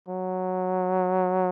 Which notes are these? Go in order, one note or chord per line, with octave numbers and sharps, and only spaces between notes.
F#3